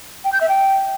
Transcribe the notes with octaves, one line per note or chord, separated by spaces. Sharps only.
G5
G6
E5
G5